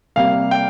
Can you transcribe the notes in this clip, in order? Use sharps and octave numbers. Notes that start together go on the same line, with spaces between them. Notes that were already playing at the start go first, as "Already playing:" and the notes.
C3 G3 A#3 F5
G5